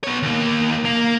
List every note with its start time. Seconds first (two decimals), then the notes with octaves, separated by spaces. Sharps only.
0.04 B3 C#5
0.23 D#2 A#3
0.85 A#3